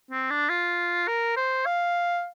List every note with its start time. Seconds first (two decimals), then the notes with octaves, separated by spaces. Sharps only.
0.11 C4
0.30 D4
0.49 F4
1.08 A#4
1.37 C5
1.66 F5